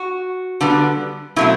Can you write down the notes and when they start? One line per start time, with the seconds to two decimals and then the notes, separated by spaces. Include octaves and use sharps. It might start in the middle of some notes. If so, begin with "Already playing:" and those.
Already playing: F#4
0.61 D3 G3 B3
1.36 B2 F#3 A3 C4 E4